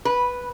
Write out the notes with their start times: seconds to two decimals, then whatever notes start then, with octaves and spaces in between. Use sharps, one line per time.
0.05 B4